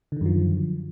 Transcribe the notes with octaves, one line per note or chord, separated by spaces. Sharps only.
F#2 D3 D#3 F3